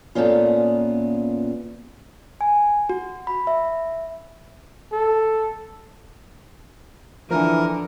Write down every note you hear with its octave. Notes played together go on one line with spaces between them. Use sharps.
A#2 A3 B3 C#4 F4
G#5
F#4
B5
E5
A4
D3 E3 F3 A#4